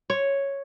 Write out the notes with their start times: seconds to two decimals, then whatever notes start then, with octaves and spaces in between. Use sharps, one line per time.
0.10 C#5